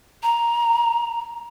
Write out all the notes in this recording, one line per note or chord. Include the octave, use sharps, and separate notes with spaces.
A#5